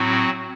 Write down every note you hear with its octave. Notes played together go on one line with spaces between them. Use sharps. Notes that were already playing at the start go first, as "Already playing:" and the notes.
Already playing: A2 F#3 C4 F#4